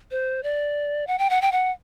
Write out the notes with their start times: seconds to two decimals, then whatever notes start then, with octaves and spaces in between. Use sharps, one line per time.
0.11 C5
0.43 D5
1.07 F#5
1.19 G5
1.30 F#5
1.42 G5
1.52 F#5